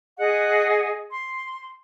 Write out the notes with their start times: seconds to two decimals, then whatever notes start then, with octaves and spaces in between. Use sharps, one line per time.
0.18 G#4 D#5 F#5
1.11 C6